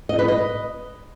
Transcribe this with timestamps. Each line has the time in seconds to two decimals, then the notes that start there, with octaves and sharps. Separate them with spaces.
0.09 D#5
0.19 B4
0.28 D#5